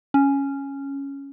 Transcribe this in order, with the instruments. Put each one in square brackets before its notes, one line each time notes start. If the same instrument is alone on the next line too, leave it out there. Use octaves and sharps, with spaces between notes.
[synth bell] C#4